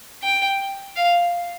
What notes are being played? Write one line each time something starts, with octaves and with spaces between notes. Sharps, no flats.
G5
F5